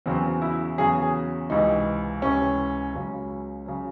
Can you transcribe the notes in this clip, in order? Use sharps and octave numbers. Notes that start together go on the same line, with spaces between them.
E2 C#3 F#3 C4
E4
E2 C#3 F#3 G#4
G#4
C#2 C3 E3 D#4
C#2 C3 E3 C#4
C#2 C#3 F#3
C#3 F#3